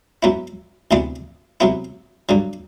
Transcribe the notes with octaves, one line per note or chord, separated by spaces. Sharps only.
F#2 F#3 B3 E4
D2 C3 E3 B3 D4
C3 F#3 B3 E4
G2 D3 F#3